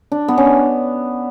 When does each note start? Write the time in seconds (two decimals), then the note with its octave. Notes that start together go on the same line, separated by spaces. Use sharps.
0.12 D4
0.28 B3
0.38 C#4
0.46 D4